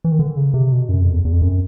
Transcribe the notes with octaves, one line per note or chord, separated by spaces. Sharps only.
E3
D#3
D3
C#3
C3
B2
F#2
F2
E2
E2
F2
F#2